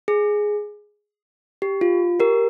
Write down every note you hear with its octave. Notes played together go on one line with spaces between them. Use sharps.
G#4
G4
F4
G4 A#4